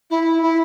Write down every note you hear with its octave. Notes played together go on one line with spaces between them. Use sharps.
E4
E4